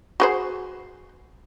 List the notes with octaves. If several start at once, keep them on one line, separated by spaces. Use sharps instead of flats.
F#4 G#4 C5